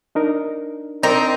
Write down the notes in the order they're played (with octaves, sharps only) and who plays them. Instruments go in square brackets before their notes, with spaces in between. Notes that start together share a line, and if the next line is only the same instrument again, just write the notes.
[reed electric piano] D4 D#4 A#4
[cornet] C4 [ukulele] D4 A#4 [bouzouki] D#4 [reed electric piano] D5